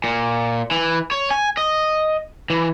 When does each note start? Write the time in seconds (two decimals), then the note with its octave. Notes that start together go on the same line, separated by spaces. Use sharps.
0.04 A#2
0.71 E3
1.11 C#5
1.31 G#5
1.57 D#5
2.50 E3